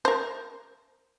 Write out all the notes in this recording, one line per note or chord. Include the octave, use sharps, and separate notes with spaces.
A#4 C5